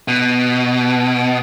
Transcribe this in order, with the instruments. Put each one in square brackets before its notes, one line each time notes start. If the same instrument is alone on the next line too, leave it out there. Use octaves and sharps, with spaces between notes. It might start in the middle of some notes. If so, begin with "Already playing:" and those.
[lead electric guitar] B2